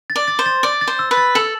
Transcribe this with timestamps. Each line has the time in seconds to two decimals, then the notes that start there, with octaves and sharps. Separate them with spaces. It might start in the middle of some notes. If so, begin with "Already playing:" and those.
0.10 A6
0.16 D5
0.28 A6
0.39 C5
0.46 A6
0.63 D5 A6
0.81 A6
0.88 C5
0.99 E6
1.11 B4
1.17 A6
1.35 A4 F#7